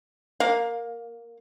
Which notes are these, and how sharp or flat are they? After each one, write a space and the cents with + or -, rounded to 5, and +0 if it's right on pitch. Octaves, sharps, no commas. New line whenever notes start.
A#3 +0 F5 +20